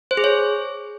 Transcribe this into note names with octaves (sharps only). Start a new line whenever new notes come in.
C5
G#4
C#5